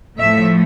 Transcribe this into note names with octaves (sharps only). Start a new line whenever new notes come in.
A2 F3 A3 E5